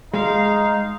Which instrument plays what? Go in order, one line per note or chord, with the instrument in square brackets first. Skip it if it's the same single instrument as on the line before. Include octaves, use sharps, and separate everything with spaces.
[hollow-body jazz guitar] G#3 [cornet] D#4 [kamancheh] F5